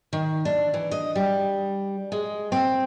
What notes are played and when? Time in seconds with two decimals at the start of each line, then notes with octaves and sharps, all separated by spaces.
0.13 D#3
0.45 D4
0.74 E3
0.91 D#5
1.15 G3
2.12 G#3
2.52 C4